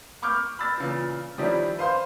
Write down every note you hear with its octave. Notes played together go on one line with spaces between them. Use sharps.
B5 C#6 D6 F6 G6
B5 E6 A6
A#2 C#3 E3
D#3 F3 G3 C#4 D4 E4
B4 C5 F5 C6 G6